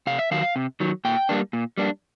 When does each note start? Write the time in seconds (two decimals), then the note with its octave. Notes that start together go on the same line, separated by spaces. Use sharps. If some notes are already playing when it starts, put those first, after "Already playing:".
0.07 C3 F5
0.19 E5
0.31 D#3 F#3 F5
0.56 C3
0.80 D#3 F#3
1.05 A#2 G5
1.29 G3 A#3 D4
1.53 A#2
1.78 G3 A#3 D4